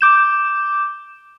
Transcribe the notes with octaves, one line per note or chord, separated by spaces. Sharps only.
D6 G6 E7